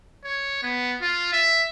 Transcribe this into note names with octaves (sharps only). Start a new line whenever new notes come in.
C#5
B3
F4
E5